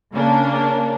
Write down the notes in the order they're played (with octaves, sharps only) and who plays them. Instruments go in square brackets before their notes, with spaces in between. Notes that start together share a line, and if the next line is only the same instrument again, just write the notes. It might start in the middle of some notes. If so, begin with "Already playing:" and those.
[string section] C#3 A#3 C#4 D4